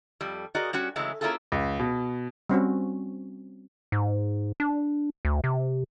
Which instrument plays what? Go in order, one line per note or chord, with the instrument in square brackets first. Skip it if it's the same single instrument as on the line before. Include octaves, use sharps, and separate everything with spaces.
[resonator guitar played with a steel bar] F2 G3
F#4 G#4 A#4 D5 D#5
G3 C#4 F#4
C#3 E3 F#3 G#3 A3
A#3 C#4 E4 F4 G#4 A4
[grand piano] C#2
B2
[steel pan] G3 C4 C#4 F#4
[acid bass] G#2
D4
D2
C3